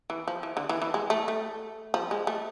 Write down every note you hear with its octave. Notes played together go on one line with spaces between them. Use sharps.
E3
F3
E3
D3
E3
E3
G#3
A3
A3
F3
G#3
A3